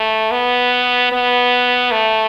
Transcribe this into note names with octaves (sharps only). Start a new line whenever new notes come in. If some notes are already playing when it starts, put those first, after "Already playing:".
Already playing: A3
B3
B3
A3